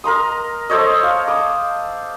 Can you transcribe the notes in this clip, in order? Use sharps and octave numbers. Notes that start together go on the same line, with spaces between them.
A#4 A#5 C6 D#6
A4 C5 C#5 D#5
F5
D6 D#6